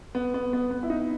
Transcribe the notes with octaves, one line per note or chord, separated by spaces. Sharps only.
B3
B3
B3
B3
E4
D#4